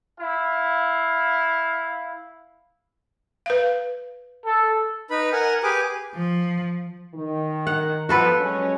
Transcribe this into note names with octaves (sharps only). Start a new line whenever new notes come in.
E4 F5
B4 F5
A4
D#4 B4 B5
A#4 F#5 G#5
G4 G#4 B4 G#5 D6
F3
D#3
F#5
F3 B3 F#4 A4 B4
F#3 G#3 C#4